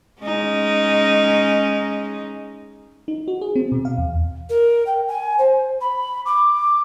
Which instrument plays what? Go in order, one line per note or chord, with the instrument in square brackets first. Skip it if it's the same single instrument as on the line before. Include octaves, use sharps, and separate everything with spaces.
[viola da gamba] G#3 C#4 D#4
[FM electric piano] D#4
F#4
G#4
C4
B2
F5
E2
[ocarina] A#4
G5
G#5
C5
B5
D6